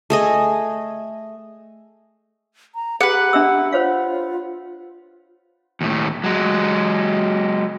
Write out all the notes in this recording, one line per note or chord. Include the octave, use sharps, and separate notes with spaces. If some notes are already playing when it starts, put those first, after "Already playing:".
A3 G#4 D#5
A#5
G4 G#4 B4 F#5
D4 E5 E6
F4 C5 C#5 F5
D#2 A2
F#3 G#3